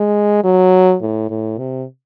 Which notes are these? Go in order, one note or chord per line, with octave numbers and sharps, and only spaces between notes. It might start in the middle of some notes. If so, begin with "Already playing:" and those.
Already playing: G#3
F#3
A2
A2
C3